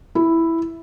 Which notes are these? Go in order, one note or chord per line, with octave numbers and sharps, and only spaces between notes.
E4